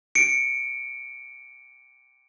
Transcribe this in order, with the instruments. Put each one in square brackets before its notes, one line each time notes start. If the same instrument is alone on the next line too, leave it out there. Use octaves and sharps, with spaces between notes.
[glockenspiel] C#7 D7